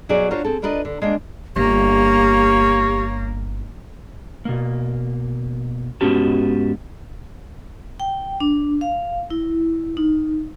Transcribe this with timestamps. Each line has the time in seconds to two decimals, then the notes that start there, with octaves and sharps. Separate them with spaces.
0.09 B2 F#3 C#4 G#4 D5
0.31 D4 F4 F#4 A#4 C5 C#5
0.45 C4 G#4 A4
0.62 D4 F4 A#4 B4 D5 D#5
0.85 D3
1.02 G#3 A#3 D4
1.56 G1 A#3 G4 C#5
4.45 B2 A#3
6.01 G#2 B3 C#4 F#4 G4 A5
8.00 G5
8.40 D4
8.81 F5
9.30 E4
9.97 D#4